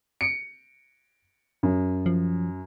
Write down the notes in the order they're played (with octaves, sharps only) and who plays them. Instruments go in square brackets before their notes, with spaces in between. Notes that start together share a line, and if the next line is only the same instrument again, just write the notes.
[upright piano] C#7 D7
F#2
[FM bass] F3